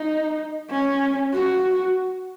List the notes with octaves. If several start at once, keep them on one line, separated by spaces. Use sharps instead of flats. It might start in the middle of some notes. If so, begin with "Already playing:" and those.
Already playing: D#4
C#4
F#4